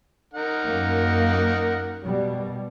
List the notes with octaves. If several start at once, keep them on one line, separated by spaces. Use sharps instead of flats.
D#4 A#4 F#5
F#2 A#3
B2 G3